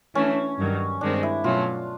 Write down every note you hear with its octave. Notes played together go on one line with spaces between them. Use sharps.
E3 A3 C#4 D4
G2 D#3 F#3
G2 D#3 G#3 C4 D4
E4
B2 F#3 A3 C#4 F4